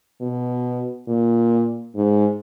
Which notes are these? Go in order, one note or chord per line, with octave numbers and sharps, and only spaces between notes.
B2
A#2
G#2